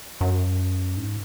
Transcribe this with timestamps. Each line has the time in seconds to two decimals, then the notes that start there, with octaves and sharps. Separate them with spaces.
0.21 F#2
0.97 G#2